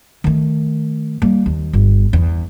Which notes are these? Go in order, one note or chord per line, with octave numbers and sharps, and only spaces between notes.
D#3 A3
G3 A#3
D#2
G1
E2